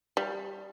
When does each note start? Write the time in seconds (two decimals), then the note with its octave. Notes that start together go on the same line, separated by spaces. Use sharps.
0.17 G3